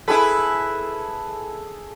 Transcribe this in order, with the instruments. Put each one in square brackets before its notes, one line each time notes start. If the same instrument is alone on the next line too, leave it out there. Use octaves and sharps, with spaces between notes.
[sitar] E4 B4 [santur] G#4 A4